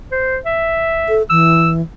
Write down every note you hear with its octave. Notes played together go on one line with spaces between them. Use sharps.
C5
E5
A4
E3 E6